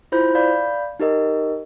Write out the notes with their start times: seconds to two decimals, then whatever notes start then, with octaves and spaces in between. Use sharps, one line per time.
0.12 E4 F4 C5 B5 G6
0.35 D5 F5 B5 G6
1.00 D#4 G4 A#4 D#5